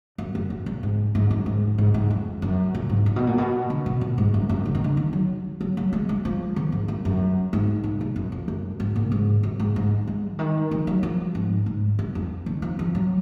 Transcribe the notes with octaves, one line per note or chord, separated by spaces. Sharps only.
F#2
F#2
A#2
A#2
G#2
G#2
F#2
G#2
G#2
G#2
F2
F#2
A#2
G#2
A#2
B2
A#2
B2
D3
B2
A#2
G#2
F#2
F#2
D3
D#3
D3
D#3
F#3
F#3
F#3
G#3
G#3
F3
D#3
G#2
F#2
F#2
G#2
A#2
B2
F#2
F2
F#2
G#2
A#2
G#2
F#2
G#2
G#2
G#3
D3
D#3
F3
F#3
F3
G#2
G#2
F#2
F2
D#3
F3
F3
F#3